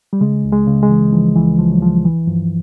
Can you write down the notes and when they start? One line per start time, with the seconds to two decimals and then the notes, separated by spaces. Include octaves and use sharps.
0.13 G3
0.21 C#3 G#3
0.45 C#2
0.52 G#3
0.67 C#3
0.83 G#3
0.90 E3
1.13 E3 F3
1.35 C#2 E3
1.59 C#2 F3
1.72 F#3
1.81 C#2 F3
2.05 E3
2.27 G2 F3